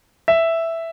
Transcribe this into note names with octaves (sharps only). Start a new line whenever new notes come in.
E5